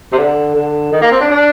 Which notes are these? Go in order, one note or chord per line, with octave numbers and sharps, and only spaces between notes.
C3
D3
D3
D#3
A#3
C4
D4
D4